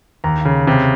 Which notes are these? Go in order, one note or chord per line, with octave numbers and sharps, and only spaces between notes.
D#2 A#5
C#3
C3